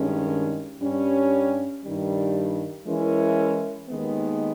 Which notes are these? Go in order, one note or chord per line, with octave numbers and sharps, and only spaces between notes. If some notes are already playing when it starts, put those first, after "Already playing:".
Already playing: G2 D#3 G#3 C#4
G2 G3 C#4
G2 D#3 G3
E3 G#3 C#4 E4 A#4
D#2 D#3 G#3 B3